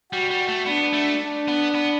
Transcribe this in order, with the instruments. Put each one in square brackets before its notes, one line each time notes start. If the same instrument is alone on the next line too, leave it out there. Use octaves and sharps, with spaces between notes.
[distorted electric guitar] G3 [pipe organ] F#4
[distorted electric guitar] G3
A3
[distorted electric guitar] B3 [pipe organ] D4
[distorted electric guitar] A3
[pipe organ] D4
[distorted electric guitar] B3
B3